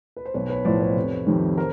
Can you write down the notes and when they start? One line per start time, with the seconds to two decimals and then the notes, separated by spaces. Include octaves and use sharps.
0.17 B4
0.25 C5
0.34 B1 B4 C#5
0.50 B4 C#5
0.65 A2 F3 C5 D5
0.80 B4 C#5
0.96 F1
1.27 F2 C3 D#3
1.58 A#4 C5